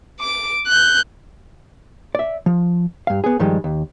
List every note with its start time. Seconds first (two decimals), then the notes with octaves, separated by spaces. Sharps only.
0.20 D6 D7
0.67 F#6 G6
2.15 D5 E5
2.46 F3
3.07 G2 F5
3.24 B3 G#4
3.39 G2 D#3 F3 G3 G#3
3.64 D#2